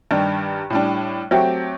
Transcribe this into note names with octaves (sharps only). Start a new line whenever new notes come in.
G2 D#3 G3 D4
A2 G3 D4
F#3 A3 C4 G4